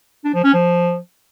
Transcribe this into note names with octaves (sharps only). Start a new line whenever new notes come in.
D4
F3
C#4
F3